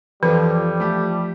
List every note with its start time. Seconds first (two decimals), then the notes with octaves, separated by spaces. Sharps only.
0.23 F2 E3 F3 G3
0.80 A3 G4